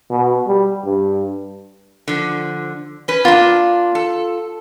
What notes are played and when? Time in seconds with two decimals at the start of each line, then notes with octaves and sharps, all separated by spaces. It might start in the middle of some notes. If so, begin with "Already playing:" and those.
0.10 B2
0.47 G3
0.85 G2
2.08 D3 F3
3.08 C#4 B4
3.25 A#3 D4 F4
3.95 A4